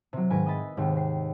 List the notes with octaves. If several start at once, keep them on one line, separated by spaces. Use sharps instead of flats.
C3 F#3
G#2 D#3 B4 G#5 A#6 D7
D#5 E5 B5 A6
D#2 G#2 C3 G5
C7